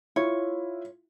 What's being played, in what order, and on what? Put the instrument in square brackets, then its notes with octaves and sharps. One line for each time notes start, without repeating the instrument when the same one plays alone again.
[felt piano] E4 F4 [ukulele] C#5